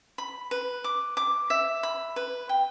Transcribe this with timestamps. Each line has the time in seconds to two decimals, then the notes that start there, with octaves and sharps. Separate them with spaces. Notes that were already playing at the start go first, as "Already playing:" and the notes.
0.18 B5
0.51 B4
0.84 D6
1.17 D6
1.50 E5
1.83 B5
2.16 B4
2.49 G5